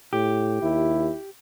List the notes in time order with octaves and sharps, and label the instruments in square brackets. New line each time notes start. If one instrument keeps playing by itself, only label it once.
[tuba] A2 [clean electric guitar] G4
[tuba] D#2 [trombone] E4